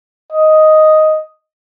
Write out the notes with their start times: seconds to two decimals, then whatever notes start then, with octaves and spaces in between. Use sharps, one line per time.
0.33 D#5